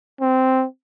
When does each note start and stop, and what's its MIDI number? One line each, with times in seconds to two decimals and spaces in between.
0.21 0.64 60